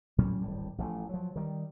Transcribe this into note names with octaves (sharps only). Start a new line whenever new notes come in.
A2 F#3 G3 C#4
D1 G#1 A2 G3
A1 F3 G3 A3
F3 F#3
D#3 G3